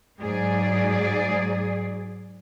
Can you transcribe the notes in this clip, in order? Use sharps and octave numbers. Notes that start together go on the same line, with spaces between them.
G#2 F#3 G#4 D5